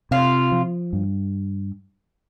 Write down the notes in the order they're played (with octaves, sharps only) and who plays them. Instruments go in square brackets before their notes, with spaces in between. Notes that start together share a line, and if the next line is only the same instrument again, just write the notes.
[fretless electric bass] C3 [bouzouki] F4
[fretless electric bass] F3
G2